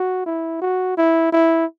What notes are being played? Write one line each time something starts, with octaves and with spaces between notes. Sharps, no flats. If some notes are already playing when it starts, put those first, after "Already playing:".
Already playing: F#4
E4
F#4
E4
E4